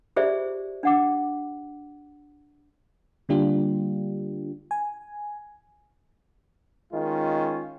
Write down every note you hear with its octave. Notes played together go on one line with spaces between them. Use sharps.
F4 G4 G#4 C5 D5 E5
D4 F#5 D6
D3 G3 A#3 D4 F4 G4
G#5
D#3 G#3 C#4 F4